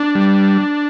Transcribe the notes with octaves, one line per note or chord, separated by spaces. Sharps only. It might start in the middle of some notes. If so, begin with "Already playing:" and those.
Already playing: D4
G3